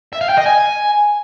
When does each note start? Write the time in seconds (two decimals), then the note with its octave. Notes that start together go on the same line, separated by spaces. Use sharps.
0.13 E5
0.21 F5
0.29 G5
0.37 D#5
0.46 G#5